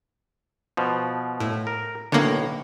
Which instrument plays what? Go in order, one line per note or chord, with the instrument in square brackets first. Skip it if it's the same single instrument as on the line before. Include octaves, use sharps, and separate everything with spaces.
[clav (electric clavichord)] B2 F3
[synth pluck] A2
[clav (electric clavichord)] A#4
[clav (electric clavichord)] B1 A2 C#5 [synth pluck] D3 A#3